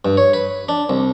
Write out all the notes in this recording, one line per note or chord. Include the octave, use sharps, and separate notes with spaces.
G2
C#5
B4
D4
C2